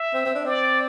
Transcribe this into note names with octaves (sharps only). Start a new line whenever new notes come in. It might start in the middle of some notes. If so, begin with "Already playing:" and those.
Already playing: E5
C4
C4
D4
C4 D5